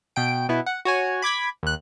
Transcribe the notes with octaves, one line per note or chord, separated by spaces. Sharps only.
B2 G5 D7
B2 B3 E4
F#5
F#4 C#5 G#5
B5 D6 G#6 B6
D#2 F#6